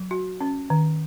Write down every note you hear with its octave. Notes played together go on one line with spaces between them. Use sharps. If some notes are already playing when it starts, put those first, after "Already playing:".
Already playing: F#3
F#4
C#4
D#3